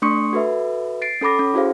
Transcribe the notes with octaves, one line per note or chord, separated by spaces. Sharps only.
A3 D4 C6 C#6 D#6 C#7
F#4 A4 B4 E5
A6 C7 D7
C#4 A4 B5 D6 A#6
C#4
E4 F#4 G#4 C5 F5